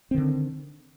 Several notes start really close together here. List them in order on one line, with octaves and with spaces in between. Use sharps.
C4 D#3 D3